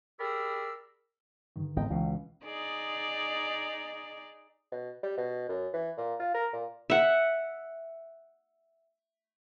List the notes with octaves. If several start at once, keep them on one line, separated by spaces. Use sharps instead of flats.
G4 G#4 A#4 D5 B5 E6
G2 D3 D#3
G#1 B3 D#5 G5
C#2 B2 E3
D#4 G#4 D5
B2
G3
B2
F#2
E3
A#2
F4
A#4
A#2
E5 F#5